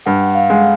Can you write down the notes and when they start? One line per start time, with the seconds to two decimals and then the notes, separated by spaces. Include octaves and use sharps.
0.06 G2 F#5
0.35 F5
0.50 G#3